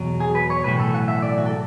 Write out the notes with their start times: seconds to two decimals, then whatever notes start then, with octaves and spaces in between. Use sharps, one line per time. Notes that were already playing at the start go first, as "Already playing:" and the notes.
Already playing: E2 B2 F#3
0.20 G#4
0.35 B4
0.50 C#5
0.64 B1 A2 E3 B4
0.80 A4
0.94 F#5
1.08 E5
1.22 D5
1.38 F#4
1.46 A4